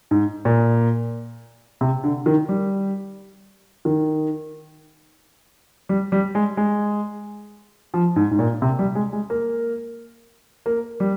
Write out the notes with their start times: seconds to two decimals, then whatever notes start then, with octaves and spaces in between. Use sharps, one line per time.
0.11 G#2
0.45 A#2
1.81 C3
2.04 D3
2.26 D#3
2.49 G3
3.85 D#3
5.89 G3
6.12 G3
6.35 G#3
6.57 G#3
7.94 F3
8.16 G#2
8.31 G#2
8.39 A#2
8.62 C3
8.79 G3
8.95 G#3
9.13 G#3
9.30 A#3
10.66 A#3
11.00 G3